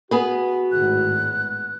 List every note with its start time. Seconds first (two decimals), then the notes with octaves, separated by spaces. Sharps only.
0.11 B3 F#4 G#4 B4
0.72 G#1 A2 F#6